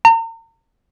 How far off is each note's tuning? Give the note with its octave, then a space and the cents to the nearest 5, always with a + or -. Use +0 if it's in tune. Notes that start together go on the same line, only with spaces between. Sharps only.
A#5 -40